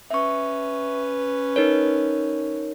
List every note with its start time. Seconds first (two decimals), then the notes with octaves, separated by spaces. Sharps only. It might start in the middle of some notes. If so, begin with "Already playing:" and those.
0.11 C#4 B4 E5 C#6
1.56 D#4 A#4 C#5